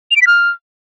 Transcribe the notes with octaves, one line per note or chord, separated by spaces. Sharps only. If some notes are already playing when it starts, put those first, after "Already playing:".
F7
D7
B6
F6